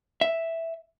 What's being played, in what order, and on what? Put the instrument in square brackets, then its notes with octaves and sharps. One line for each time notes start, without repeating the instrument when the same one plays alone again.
[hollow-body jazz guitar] E5